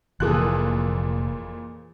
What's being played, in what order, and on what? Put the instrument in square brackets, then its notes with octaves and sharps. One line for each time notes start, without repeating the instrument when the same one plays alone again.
[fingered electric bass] F1 [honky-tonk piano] F2 A#2 F#6 [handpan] E3 G#4 A4